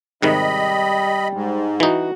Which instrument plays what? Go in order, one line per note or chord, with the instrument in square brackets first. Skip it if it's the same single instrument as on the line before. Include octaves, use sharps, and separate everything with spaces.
[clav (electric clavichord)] G#2 C3 D#3 [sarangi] G3 [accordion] D#5 B5
[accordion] G#2
[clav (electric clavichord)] E3 D#4 [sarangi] F#4